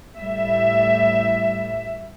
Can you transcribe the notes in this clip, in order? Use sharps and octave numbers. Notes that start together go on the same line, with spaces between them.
A2 G3 E5